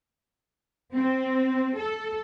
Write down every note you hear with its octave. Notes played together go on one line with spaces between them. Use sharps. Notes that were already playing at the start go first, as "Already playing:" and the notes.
C4
A4